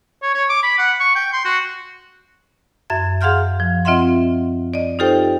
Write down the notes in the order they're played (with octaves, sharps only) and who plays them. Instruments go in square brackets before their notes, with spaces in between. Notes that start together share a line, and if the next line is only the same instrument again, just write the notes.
[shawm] C#5
C#5
D6
B5
F#5
C#6
G5
C6
F#4
[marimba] F#2 E5 G#6
G#4 F5 F#5 C6 F6 G6
F3
C4 F4 D#5 E5 F#5 C6
D5 D#5
D#4 F4 G4 A4 C5 G5